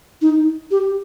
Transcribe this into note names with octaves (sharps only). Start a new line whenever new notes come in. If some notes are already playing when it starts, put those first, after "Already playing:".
D#4
G4